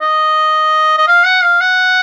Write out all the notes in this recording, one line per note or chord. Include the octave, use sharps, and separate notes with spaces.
D#5
D#5
F5
F#5
F5
F#5